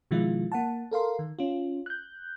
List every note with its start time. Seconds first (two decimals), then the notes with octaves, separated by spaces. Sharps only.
0.11 B2 D#3 F3 G#3 E4 F4
0.52 A#3 F#5 A5
0.91 A4 A#4 F5 C6
1.19 D#3
1.39 C#4 F4
1.86 F#6 G6